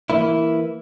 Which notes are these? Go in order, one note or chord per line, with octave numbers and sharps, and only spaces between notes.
E3 A#3 E4